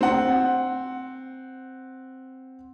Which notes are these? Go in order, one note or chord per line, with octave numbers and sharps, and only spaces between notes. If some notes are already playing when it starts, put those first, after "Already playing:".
C4 F#5